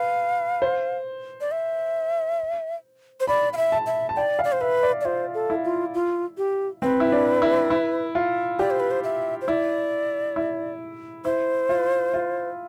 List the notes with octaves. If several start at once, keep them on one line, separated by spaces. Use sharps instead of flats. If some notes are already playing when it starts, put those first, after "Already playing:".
Already playing: B4 F5
C5
D5
E5
C5
D5 B5
F5
E5
A5
E5
A5
D5 G5
F5
D5
C5
B4 E5
D5
D5
F4 C5
A4
E4
F4
F4
G4
C4 B4
E4
D4
E4
E4
F4
G4 D5
C5
B4
C5
E5
C5
E4 D5
E4
E4 C5
F4
F4